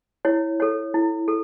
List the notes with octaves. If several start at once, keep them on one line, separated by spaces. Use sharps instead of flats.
E4 C#5
A4 C#5
E4
A4